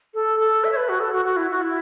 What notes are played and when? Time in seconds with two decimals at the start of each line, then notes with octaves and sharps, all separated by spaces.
0.14 A4
0.40 A4
0.64 E5
0.72 C#5
0.76 B4
0.89 F#4
1.00 A4
1.13 F#4
1.25 F#4
1.37 E4
1.50 F#4
1.62 E4